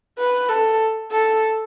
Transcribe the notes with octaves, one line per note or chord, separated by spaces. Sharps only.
B4
A4
A4